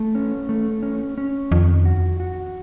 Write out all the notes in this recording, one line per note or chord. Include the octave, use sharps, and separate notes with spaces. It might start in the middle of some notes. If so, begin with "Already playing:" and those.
Already playing: A3
C#4
A3
C#4
C#4
F2 D#3
F#4
F#4